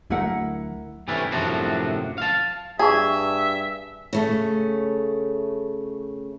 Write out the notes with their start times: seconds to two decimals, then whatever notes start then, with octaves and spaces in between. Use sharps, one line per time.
0.10 D2 F#3 A3 E4 A#4 F#5
1.08 C3 E3 A3 C#4 D4 E4
1.32 F#2 A2 C3 F3 D4 F#4
2.18 F5 A5
2.79 G2 G#4 E5 A5 C#6
4.13 C#3 A3 C#4